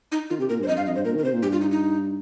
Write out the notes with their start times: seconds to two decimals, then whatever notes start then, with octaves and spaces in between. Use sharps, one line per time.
0.12 D#4
0.30 D#3 F4
0.39 C3 G4
0.49 A#2 A#4
0.59 G2
0.63 C5
0.68 F2 D#5
0.77 G2 F5
0.86 F2 D#5
0.96 G2 C5
1.05 A#2 A#4
1.15 D#3
1.18 A#4
1.24 C3 C5
1.33 A#2
1.42 G2 G4
1.52 F4
1.61 D#4
1.71 D#4